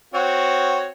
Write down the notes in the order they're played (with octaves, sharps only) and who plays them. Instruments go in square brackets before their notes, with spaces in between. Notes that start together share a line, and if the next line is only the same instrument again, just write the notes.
[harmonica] C4 F#4 C#5